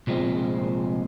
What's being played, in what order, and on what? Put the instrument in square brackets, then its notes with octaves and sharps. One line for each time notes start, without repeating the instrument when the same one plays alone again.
[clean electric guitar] C2 A#2 F3 G#3 C4